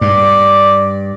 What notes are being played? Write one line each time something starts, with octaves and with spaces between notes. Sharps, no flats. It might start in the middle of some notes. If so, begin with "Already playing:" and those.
G2 D5